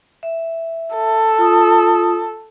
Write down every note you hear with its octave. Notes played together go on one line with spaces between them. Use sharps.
E5
A4
F4 D#6